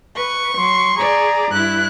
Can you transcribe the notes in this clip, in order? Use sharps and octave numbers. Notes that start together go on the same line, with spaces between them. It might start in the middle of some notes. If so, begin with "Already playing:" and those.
B4 C#6
F#3 C6
G#4 D5 A#5
G2 E4 F#6